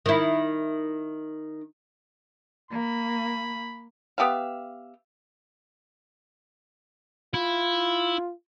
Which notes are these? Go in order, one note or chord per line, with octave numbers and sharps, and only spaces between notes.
D#3 E4
A#3 B5
B3 G4 E5 F5
E4 F4